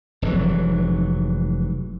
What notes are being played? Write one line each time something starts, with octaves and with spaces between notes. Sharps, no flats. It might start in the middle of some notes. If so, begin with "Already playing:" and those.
F1 G#2 E3 F#3